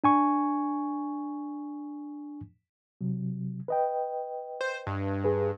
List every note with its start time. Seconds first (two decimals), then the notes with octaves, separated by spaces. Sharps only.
0.04 D4 G#5 C#6
3.01 C3 F#3
3.68 B4 D#5 G5
4.61 C5
4.87 G2
5.24 G#4 B4